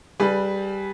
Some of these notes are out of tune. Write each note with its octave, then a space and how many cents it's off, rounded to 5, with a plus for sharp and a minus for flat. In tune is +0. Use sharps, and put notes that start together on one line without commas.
G3 +0 G#4 +30 B4 +0